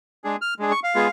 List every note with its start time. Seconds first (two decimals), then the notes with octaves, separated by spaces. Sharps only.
0.24 G#3 D4 G#4
0.41 F6
0.59 G#3 D4 G#4
0.71 C#6
0.84 F5
0.95 G#3 B3 F4 G#4